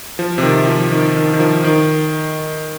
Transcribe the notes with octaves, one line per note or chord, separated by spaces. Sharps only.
F3
C3
D#3
F3
D#3
D#3
D#3
F3
D#3